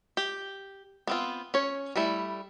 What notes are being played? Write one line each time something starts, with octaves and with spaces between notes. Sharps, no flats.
G4
B3 C4 F4
C#4 C#5
G3 A3 E4